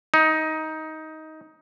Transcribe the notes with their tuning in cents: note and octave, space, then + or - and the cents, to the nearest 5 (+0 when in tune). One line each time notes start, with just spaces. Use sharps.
D#4 +15